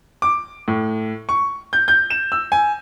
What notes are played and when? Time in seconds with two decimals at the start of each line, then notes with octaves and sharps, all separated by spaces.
0.22 D6
0.68 A2
1.29 C#6
1.73 G6
1.88 G6
2.10 E7
2.32 E6
2.52 G#5